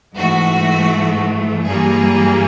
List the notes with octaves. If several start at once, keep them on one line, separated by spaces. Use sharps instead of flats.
G#2 E3 A3 F#4
G2 E3 G3 A#3 G#4